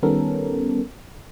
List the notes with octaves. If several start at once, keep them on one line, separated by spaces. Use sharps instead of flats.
D#3 G3 B3 C#4 A4 A#4